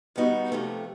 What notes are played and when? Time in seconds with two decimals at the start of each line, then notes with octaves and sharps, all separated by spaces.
0.16 D#3 G3 B3 D#4 F#4
0.52 F2 C3 F3 A3